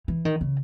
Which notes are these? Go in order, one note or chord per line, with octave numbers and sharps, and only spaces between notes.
E3
D#3
C#3